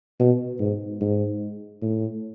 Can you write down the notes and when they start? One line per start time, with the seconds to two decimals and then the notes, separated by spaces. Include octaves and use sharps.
0.19 B2
0.59 G#2
1.01 G#2
1.82 A2